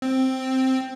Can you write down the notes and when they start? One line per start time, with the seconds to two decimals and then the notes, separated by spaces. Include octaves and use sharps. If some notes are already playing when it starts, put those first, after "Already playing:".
0.02 C4